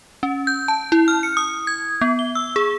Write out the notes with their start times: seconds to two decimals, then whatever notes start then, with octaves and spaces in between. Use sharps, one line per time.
0.23 C#4
0.47 G6
0.68 A5
0.92 E4
1.08 F6
1.23 C#7
1.37 D#6
1.67 G#6
2.01 B3
2.19 G7
2.35 E6
2.56 G#4